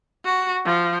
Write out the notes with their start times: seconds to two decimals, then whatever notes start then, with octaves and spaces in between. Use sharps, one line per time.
0.25 F#4
0.66 F3